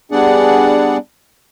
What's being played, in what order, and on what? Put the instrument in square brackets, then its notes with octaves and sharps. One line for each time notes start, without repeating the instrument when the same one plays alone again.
[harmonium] G3 B3 D4 G#4 D5 F#5